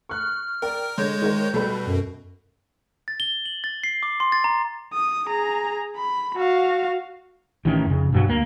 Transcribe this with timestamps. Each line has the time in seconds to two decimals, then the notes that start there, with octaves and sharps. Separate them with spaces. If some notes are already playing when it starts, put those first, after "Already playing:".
0.09 C#6 F6 F#6
0.62 A#4 D5 G5
0.98 D3 G#3 C#5 G6
1.22 D#3 A#4 C5
1.54 B2 G3 A4 B4
1.86 F#2
3.08 A6
3.20 G7
3.46 F#7
3.64 A6
3.84 C7
4.03 D6
4.20 C6
4.32 A6
4.44 A#5
4.94 D#6
5.28 G#4 A#5
5.96 B5
6.37 F#4 F5
7.65 A1 D#3 E3 C#4
7.86 F2 C#3
8.12 G2 B2 F#3
8.28 D2 A#3